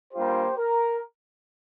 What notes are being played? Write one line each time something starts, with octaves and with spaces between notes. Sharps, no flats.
G3 A#3 D4 F4 G4 C5
A#4